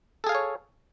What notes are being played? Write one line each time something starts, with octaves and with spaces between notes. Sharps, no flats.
G#4 A4 C#5 F5 G#5